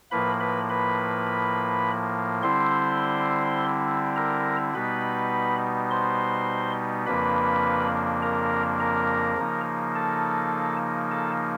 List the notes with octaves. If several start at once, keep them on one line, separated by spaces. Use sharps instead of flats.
A2 F3 A#3 B4 B5
B4 B5
B4 B5
D3 G3 C4 E4 C5 C6
A#4 A#5
B2 G3 B3 D#4 B4 B5
C5 C6
F2 C#3 F3 A#3 D4 B4 B5
A#4 A#5
A#4 A#5
C#3 F3 A#3 D#4
A4 A5
A4 A5